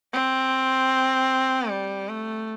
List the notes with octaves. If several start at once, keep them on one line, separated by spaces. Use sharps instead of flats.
C4
G3
A3